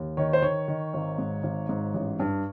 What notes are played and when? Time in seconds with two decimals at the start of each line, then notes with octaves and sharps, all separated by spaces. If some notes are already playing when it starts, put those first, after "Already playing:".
Already playing: D#2
0.17 D#3 C#5
0.33 C5
0.42 D#3 C#5
0.68 D#3
0.94 G#1
1.18 G#2
1.43 G#1
1.69 G#2
1.94 A1
2.20 G2